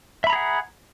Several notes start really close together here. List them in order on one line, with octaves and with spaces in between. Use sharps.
E5 B5 A#5 G#4 F#5